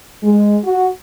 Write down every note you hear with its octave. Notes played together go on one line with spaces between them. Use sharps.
G#3
F#4